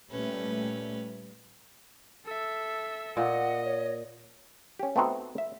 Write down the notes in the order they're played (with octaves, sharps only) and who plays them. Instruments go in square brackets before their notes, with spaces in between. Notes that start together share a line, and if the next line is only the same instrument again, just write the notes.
[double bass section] A#2 G3 A3 [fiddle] C#4 B4
[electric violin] A4 E5
[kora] A#2 [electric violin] D#5 [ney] F#5
[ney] C#5
[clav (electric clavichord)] C#4 G4
A3 B3 C4 D#4 F#4
E5